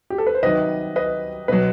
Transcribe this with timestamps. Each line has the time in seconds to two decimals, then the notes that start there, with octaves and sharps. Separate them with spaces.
0.10 G4
0.18 A4
0.27 B4
0.35 C5
0.43 C3 D#3 F#3 B4 D#5
0.96 B4 D#5
1.48 B2 F#3 B4 D#5